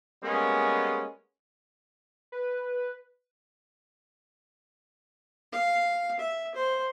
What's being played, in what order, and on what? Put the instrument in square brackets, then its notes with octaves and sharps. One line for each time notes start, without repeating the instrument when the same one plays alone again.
[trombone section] G3 G#3 A#3 B3 C#4 G#4
[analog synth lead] B4
[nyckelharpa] F5
E5
C5